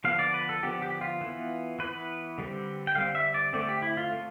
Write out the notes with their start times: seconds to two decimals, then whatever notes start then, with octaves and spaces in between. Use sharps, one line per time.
0.04 D3 F3 B3 F5
0.19 D5
0.34 B4
0.49 A4
0.63 D3 F3 B3 G4
0.82 G4
1.01 F4
1.21 E3 B3
1.79 E3 B3 B4
2.38 D3 G3 C4
2.87 G5
2.95 D3 G3 C4 F5
3.15 E5
3.34 D5
3.53 D3 A3 C4 D5
3.69 G4
3.82 E4
3.97 F4
4.12 D3 A3